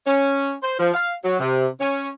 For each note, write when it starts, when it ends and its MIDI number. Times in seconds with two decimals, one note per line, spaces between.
0.07 0.53 61
0.63 0.74 72
0.79 0.92 53
0.94 1.12 77
1.24 1.37 54
1.40 1.67 48
1.80 2.09 61